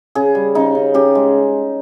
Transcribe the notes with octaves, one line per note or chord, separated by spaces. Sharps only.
C#3 G#4
G3
C#3 D#4
C#3
C#3 G4
G#3